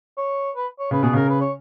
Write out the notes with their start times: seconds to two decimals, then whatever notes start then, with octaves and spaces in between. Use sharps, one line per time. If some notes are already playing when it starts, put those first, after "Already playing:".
0.17 C#5
0.55 B4
0.79 C#5
0.91 C#3 B4
1.03 B2 G#4
1.13 C#3 A#4
1.29 B4
1.41 C#5